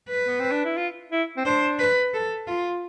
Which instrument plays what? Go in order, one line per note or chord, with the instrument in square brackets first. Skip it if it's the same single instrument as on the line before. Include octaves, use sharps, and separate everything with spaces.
[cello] B4
[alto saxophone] B3
C4
D4
E4
F4
E4
C4
[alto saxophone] D4 [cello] C5
[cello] B4
A4
F4